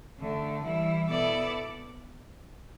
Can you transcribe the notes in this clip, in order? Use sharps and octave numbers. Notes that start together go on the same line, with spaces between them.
D2 D3 A3
E3 G3 E4
B2 B3 E4 A4 D5